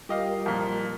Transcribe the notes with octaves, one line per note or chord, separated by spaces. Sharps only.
G3 F4 G4 A#4 D#5 F5
F2 A#2